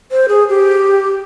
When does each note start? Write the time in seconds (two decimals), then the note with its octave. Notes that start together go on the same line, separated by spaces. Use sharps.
0.11 C5
0.28 G#4
0.49 G4